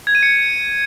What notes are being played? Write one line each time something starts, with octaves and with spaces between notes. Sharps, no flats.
G#6
D#7
C#7